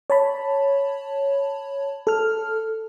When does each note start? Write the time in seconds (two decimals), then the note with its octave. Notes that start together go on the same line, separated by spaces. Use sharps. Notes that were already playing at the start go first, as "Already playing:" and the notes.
0.10 C#5 A5 B5
2.07 A4 F6